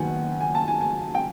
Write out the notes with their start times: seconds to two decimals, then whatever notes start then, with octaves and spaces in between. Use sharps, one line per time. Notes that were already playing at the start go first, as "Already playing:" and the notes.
Already playing: F#1 F#2 D#3 F#3 B3 F#5 G#5
0.40 G#5
0.55 A5
0.68 G#5
0.81 G#5
1.15 G5